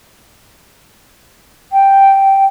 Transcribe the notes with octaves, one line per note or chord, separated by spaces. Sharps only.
G5